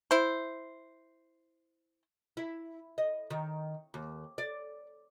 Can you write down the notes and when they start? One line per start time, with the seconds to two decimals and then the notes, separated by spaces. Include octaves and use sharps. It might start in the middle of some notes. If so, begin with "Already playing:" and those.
0.11 E4 C5
2.37 E4
2.98 D#5
3.31 D#3
3.94 D#2
4.38 D5